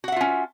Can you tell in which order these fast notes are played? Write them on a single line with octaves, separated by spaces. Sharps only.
F#4 F#5 E5 F4 C#4